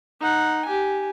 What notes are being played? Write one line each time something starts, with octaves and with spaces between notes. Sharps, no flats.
D#4 F#5
G4 G#5